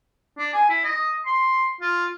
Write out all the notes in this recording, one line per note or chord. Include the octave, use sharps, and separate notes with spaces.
D4
G#5
E4
D#5
C6
F4